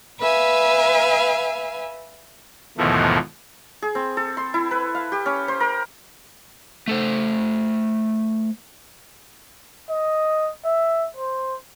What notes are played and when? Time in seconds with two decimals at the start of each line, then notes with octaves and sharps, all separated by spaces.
0.20 B4 E5 F5 G#5
2.77 D#2 G#2 B2 E3 F3 A3
3.82 G#4
3.95 C4
4.17 A4
4.37 C6
4.54 E4
4.71 B4
4.95 F5
5.12 G4
5.26 C#4
5.48 C5
5.60 A#4
6.88 A3 A4 C5
9.89 D#5
10.64 E5
11.17 C5